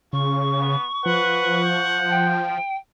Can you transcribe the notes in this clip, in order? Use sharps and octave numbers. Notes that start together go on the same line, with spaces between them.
C#3 F4 C#6
B3
F3 B4 F#5
G6
G5